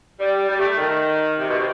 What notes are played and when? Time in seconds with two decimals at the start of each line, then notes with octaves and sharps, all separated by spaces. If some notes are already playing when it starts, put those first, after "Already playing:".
0.17 G3
0.48 G3
0.58 A3
0.77 D#3
1.38 C3
1.48 B2
1.58 C3